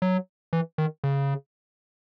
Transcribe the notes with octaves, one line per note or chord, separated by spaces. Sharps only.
F#3
E3
D#3
C#3